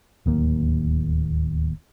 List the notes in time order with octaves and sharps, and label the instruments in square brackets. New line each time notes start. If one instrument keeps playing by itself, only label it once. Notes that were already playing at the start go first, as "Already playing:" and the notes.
[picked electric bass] D1 D#2 A#3